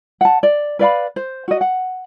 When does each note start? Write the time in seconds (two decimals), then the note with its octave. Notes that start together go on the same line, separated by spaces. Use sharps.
0.21 F#5 A5
0.43 D5
0.79 B4 D5 F5 B5
1.16 C5
1.48 F#4 D#5
1.61 F#5